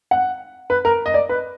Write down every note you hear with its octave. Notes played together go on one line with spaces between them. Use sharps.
F#5
B4
A#4
D#5
D5
B4